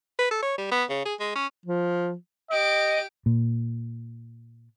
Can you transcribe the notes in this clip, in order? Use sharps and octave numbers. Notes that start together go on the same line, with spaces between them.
B4
A4
C#5
G3
B3
C#3
G#4
G#3
C#4
F3
G4 D#5 D7
A#2